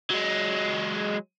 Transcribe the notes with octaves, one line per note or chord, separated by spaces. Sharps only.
F#3 G#3